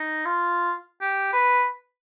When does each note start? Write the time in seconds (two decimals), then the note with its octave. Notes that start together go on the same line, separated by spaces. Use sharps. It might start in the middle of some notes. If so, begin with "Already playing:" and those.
Already playing: D#4
0.25 F4
1.01 G4
1.33 B4